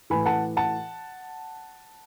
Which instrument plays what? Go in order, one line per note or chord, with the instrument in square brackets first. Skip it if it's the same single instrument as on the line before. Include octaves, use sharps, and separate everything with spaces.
[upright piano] A2 E3 G#5 B5
F#5 A5
F#5 A5